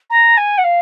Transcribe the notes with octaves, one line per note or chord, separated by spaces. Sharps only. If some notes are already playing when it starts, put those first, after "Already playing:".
A#5
G#5
F#5
F5